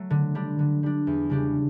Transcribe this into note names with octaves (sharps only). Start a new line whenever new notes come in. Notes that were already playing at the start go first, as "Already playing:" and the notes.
Already playing: F#3 A3
D3
G3 D4
D3
G3 D4
E2
C#3 G3 D4 G4